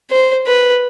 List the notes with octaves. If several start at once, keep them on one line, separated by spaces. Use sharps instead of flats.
C5
B4